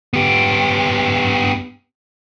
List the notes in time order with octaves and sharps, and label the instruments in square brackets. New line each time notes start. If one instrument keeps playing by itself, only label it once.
[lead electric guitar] B3 G4